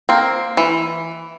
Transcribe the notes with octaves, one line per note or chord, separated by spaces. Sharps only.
A#3 C4
E3